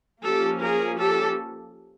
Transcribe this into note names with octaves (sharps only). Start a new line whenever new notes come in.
F3 A#3 C#4 G4 A4
G#4 A#4
G4 A4